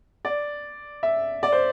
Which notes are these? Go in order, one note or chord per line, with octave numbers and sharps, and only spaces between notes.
D5
E5
D5
C5